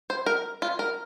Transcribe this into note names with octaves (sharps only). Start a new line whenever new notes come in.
C5
A#4
F4
A#4